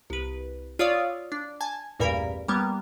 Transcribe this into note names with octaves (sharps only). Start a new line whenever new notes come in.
C2 B4
F4 C#5 D5 F5 D#6 E6
D4
G#5 A5 G#6
A1 E2 G2 A#2 A#4 B5
G3 A#3 B3